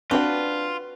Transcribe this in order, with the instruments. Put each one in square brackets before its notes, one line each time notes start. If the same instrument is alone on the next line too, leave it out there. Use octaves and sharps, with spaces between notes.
[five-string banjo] C4 F#4 G5 [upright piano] D4 [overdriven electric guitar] F4 [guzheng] B4